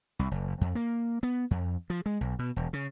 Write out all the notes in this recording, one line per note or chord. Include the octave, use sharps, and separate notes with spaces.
C2
F#1
F2
A#3
B3
F2
F3
G#3
B1
B2
E1
C#3